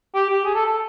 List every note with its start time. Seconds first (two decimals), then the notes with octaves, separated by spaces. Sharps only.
0.15 G4
0.30 G4
0.45 G#4
0.55 A4
0.66 A4